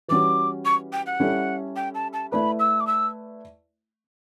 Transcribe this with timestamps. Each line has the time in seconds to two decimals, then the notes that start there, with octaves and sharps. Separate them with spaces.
0.08 E3 G3 C#4 F#4 D6
0.65 C#6
0.92 G5
1.06 F#5
1.20 G3 C#4 E4 A4
1.76 G5
1.95 A5
2.13 A5
2.32 A3 E4 B4 D5 B5
2.59 E6
2.80 D6
2.87 E6